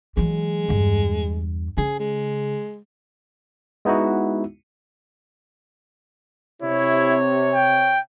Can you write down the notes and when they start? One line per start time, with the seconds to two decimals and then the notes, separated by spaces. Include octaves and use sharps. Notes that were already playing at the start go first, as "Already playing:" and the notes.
0.17 E3 F#3 G#3
0.69 E2 G2
1.78 C#3 G#4
2.00 G#3
3.85 G#3 B3 D#4 E4 F#4
6.62 C3 E4 C#5
7.53 G5